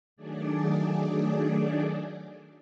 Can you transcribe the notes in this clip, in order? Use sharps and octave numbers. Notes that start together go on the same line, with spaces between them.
D#3 F#3 A3 D4 G#4 D5